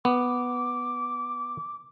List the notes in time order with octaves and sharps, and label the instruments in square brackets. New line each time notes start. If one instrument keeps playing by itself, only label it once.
[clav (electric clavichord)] B3 [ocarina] D6